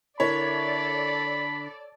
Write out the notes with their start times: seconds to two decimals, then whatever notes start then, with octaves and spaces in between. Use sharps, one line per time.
0.20 D3 E4 A4 A#4 C#5 D5 B5